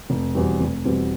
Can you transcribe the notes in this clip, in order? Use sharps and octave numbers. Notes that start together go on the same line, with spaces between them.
F1
E2 B2 G3 C4
F1
E2 B2 G3 C4